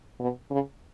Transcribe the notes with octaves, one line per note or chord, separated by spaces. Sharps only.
B2
C#3